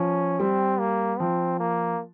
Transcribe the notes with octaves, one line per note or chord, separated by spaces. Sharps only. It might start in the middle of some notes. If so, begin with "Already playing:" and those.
Already playing: F3 C#4
G3 C4
A#3
F3 C4
A#3